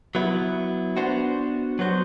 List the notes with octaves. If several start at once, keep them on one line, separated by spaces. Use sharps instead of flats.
F#3 B3 E4
B3 D4 F#4 C5
F#3 B3 F#4 C5